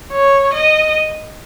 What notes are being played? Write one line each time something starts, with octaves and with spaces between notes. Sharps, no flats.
C#5
D#5